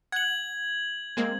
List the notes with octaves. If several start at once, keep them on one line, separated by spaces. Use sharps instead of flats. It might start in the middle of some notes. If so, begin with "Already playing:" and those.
F#5 G#6 F#7
G#3 A#3 C4